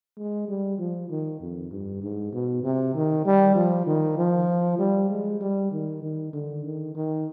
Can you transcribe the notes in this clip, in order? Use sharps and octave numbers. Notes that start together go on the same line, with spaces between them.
G#3
G3
F3
D#3
F2
G2
G#2
B2
C3
D#3
G3
F3
D#3
F3
G3
G#3
G3
D#3
D#3
D3
D#3
D#3